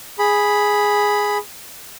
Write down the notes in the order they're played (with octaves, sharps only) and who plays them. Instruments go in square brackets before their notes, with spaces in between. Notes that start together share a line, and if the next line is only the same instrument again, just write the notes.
[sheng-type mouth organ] G#4 B5